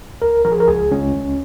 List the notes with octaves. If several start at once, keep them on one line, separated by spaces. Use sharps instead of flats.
C#2 A#4
F3 A#4
G#4
A#4
C#2 G#4
C#2 C#4
C#2